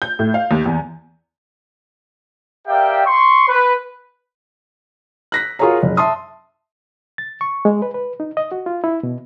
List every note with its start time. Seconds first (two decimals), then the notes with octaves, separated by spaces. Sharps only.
0.02 G6
0.19 A2
0.34 F5
0.51 D#2
0.66 E2
2.67 G4 A#4 D5 E5 F5 G5
3.06 C6 C#6
3.48 B4
5.32 F#6 A#6 B6
5.59 F4 F#4 G#4 A#4 C#5 A#5
5.83 F#1
5.97 E5 A5 C6 D#6
7.18 A6
7.41 C#6
7.65 G#3
7.82 B4
7.94 B4
8.20 D#4
8.37 D#5
8.52 F#4
8.66 F4
8.84 E4
9.03 B2